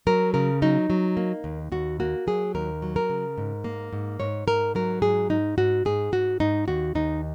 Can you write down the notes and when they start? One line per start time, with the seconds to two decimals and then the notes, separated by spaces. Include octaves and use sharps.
0.07 F#3 A#4
0.34 C#3 A#4
0.62 F#3 D#4
0.90 F#3
1.17 A#3
1.44 D#2
1.72 D#2 F#4
2.00 A#3 F#4
2.27 F#3 G#4
2.55 D#2 A#4
2.82 F#3
2.96 A#4
3.10 C#3
3.38 G#2
3.64 A#3
3.93 G#2
4.20 G#2 C#5
4.47 G#2 A#4
4.75 F#3 A#4
5.02 G#2 G#4
5.30 G#2 D#4
5.58 G#2 F#4
5.85 G#2 G#4
6.12 G#2 F#4
6.40 G#2 D#4
6.68 D#2 F#4
6.95 D#2 D#4